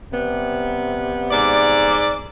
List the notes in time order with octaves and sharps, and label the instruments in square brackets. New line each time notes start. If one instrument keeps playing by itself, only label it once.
[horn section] C3 G3 B3
[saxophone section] G#2 D5